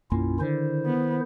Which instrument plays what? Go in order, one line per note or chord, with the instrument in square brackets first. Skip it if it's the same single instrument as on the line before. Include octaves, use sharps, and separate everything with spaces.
[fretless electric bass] B1 F#2 A#3 [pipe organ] C#4 E4 F4
[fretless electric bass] D3 [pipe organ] D#3 E4 C5
[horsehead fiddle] B3